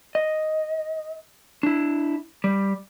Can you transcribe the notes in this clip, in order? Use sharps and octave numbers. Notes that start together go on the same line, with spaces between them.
D#5
D4 E4
G3